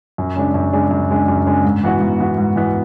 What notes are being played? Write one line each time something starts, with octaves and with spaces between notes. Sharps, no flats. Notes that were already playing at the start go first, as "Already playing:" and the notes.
F#2
C#3 G#3 D4
F#2
C#3 G#3 D4
F#2
C#3 G#3 D4
F#2
C#3 G#3 D4
G#2
E3 B3 F#4
G#2
E3 B3 F#4
G#2
E3 B3 F#4